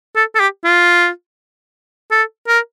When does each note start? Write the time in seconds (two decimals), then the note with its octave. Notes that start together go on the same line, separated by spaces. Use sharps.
0.16 A4
0.35 A4
0.40 G4
0.64 F4
2.11 A4
2.48 A#4